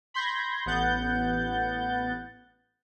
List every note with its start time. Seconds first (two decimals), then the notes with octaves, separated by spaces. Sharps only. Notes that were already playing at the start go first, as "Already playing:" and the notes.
0.14 B5 C6 G6 G#6 A#6
0.66 A1 B3 F#5 G6 A6